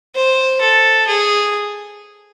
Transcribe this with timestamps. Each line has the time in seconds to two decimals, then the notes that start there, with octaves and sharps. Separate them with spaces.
0.16 C5
0.61 A4
1.07 G#4